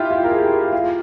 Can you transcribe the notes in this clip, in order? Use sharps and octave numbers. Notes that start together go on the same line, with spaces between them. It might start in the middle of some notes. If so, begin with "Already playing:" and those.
Already playing: E4 F4 G4
F4
A#4
G#4
G4
F4